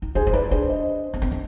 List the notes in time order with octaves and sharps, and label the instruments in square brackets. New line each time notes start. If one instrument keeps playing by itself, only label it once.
[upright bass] D#4
[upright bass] D4 [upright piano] G#4 C5
[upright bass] D4
[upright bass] D#4 [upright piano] B4 D5
[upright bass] D4 [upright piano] G#4 C5
[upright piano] C5 D#5
[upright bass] B3
C4
D4